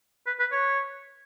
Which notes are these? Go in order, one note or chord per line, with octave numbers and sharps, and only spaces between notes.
B4
B4
C#5